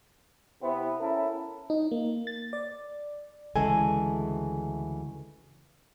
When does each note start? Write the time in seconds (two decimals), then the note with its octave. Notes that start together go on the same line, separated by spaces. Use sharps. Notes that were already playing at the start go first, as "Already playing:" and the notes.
0.62 C3 B3 C4 E4
1.01 C#4 E4 A4 A#4
1.70 D#4
1.91 A#3
2.27 A6
2.53 D5
3.56 D2 C#3 E3 G#3 A4 G#5